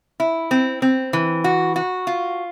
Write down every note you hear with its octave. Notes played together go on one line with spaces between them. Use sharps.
E4
C4
C4
E3
F#4
F#4
F4